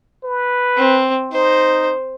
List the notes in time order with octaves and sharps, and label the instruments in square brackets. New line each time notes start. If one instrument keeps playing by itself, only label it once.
[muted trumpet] B4
[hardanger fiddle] C4
[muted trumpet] D#4 [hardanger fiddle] C5